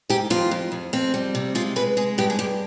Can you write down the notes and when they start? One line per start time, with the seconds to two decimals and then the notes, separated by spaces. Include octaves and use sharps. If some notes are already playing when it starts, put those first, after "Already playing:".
0.10 G#2 G4
0.30 F2 F4
0.51 F2
0.72 F2
0.93 F2 C4
1.14 G3
1.35 C3
1.55 G#3 F4
1.76 G#3 B4
1.97 G#3 G#4
2.18 G2 G4
2.30 G#4
2.38 G2 G4